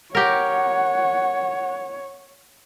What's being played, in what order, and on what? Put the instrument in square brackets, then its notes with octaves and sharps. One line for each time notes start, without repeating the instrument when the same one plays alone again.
[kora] G4 A#4 [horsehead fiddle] C#5 [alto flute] F#5